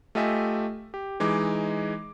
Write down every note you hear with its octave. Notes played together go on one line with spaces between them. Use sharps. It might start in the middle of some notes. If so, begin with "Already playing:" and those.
A3 F4 G4 D#5 E5 G#5
G4
E3 G#3 D#4 D6